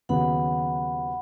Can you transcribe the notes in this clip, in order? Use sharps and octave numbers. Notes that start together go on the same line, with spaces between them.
D#2 C#3 F#3 B3 F#5 B5